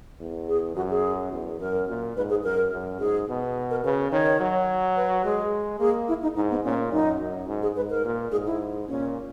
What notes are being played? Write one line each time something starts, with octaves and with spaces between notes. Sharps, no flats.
E2
G#4
F#2 F#4
G#4
E2
F#2 A#4
A#2
G#2 B4
G#4
F#2 A#4
F#2
G#2 G#4
B2
A#4
C#3 B4
D#3 C#5
F#3
B4
G#3 G#4
A#3 G#4
E4
D#4
G#2 D#4
B3
A#2 C#4
F#2 D#4
F#2
G#2
G#4
G#2 B4
A#4
A#2
G#2 G#4
E4
A#2 C#4